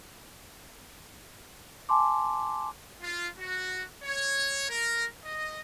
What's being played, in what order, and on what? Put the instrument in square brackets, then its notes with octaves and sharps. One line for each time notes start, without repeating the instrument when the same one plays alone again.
[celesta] G#5 A5 C6 D6
[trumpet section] F4
F#4
C#5
A#4
D#5